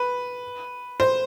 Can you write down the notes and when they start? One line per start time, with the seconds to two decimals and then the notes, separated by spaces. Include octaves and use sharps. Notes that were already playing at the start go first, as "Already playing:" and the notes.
Already playing: B4
1.00 C5